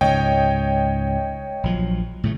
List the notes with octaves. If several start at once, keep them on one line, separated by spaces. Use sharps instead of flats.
C#2 G#2 C#5 D#5 G5
A#1 F3 F#3
A2 C#3 A3